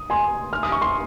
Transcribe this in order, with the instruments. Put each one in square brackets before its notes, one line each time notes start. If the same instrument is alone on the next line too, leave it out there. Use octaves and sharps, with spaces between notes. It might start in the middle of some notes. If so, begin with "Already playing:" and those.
Already playing: [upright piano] D#6
G#5 C6
F6
D#6
C#6
C6